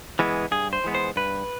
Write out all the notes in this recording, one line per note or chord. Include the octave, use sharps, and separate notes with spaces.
E3 G#3 B3
G2 G#4
C5
E3 G#3 B3
C5
G2 B4